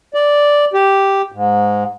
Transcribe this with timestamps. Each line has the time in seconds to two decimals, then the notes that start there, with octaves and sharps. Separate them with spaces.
0.14 D5
0.74 G4
1.32 G#2